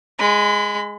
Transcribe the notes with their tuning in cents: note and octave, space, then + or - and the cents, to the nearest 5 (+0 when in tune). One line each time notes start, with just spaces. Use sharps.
G#3 +0 B5 +35